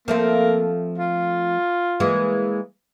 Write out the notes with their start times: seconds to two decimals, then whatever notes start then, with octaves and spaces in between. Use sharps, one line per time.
0.08 F3 A3 A#3 C4
0.98 F4
2.00 E3 G#3 A#3